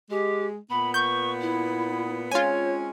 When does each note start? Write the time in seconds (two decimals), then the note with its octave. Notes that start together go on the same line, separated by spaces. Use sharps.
0.10 G#3 G4
0.70 A#2 B3 B5
0.94 C#6 G6
1.41 E4
2.32 G#3 C4 C#4 F4 C#5 G#5